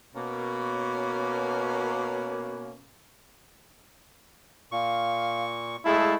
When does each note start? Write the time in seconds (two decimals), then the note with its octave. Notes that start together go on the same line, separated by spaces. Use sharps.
0.15 B2 A#3 C#4
4.72 A#2 F5 C#6
5.86 G#3 A3 E4 G#4 F5 A5